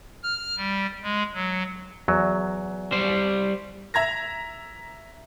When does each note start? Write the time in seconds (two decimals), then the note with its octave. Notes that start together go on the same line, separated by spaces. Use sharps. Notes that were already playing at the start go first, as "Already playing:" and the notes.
0.23 F6
0.57 G3
1.03 G#3
1.33 F#3
2.08 E2 F#3
2.92 G3 C5
3.94 E5 A#5 G#6 A#6